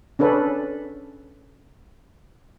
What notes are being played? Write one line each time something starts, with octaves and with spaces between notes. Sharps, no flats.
C#4 D4 A4 B4